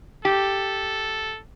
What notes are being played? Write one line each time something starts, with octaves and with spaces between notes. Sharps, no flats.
G4 A4